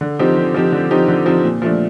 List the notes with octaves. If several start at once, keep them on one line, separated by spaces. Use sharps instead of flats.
D3
F3 C4 D#4 G4
D3
F3 C4 D#4 G4
D3
F3 C4 D#4 G4
D3
F3 C4 D#4 G4
A#2
F3 A3 D4